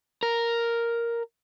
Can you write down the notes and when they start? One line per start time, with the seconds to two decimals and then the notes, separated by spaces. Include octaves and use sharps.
0.23 A#4